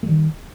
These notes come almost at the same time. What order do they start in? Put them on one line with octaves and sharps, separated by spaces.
A3 G3 D#3